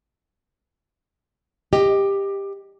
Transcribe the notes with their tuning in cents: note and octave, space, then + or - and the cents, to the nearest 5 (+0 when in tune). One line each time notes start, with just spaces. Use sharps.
G4 +15 D#5 +5